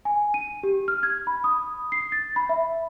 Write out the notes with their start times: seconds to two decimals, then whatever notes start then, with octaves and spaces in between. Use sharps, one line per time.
0.05 G#5
0.34 D#7
0.63 G4
0.88 F6
1.03 G#6
1.27 B5
1.44 D#6
1.92 C7
2.12 A6
2.36 B5
2.49 E5